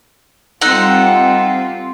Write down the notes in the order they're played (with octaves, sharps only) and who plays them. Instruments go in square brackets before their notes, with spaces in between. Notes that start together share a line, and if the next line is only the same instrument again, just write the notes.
[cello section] G3 C4 F4 [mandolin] D#4 A4 F#5